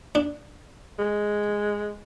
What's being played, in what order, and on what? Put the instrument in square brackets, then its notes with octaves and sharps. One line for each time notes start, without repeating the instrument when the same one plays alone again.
[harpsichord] D4
[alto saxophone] G#3